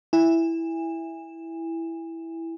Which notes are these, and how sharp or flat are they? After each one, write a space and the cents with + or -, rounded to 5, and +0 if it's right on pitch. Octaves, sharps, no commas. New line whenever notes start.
E4 +0 G#5 -30